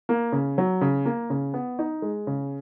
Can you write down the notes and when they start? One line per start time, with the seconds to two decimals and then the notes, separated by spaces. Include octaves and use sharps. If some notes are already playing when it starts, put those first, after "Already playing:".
0.09 A#3
0.32 C#3
0.58 F#3
0.81 C#3
1.05 A#3
1.30 C#3
1.54 B3
1.79 D#4
2.02 G#3
2.27 C#3